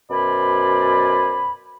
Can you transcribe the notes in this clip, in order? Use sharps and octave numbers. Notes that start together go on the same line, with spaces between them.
F#2 B2 C5 D5 G#5 B5